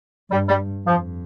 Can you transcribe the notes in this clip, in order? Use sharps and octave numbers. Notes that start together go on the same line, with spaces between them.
G2 G3
G3
F2 F3